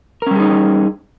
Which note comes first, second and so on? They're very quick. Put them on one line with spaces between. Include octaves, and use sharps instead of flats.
A#4 C#4 G3 G#4 D#4